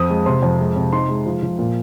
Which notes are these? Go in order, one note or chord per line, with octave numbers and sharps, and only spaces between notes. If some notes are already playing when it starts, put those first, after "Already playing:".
Already playing: F2 C4 D#6
G#3
C3 C6
F2
G#3
C3
D#4 C6
G#3
F3
F3
A#2